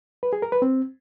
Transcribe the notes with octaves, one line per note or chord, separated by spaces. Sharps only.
B4
G#4
A#4
B4
C4